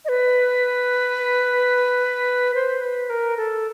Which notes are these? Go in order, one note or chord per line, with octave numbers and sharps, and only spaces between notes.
D#5
B4
C5
B4
A#4
A4